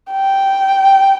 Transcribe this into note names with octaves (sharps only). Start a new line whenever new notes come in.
G5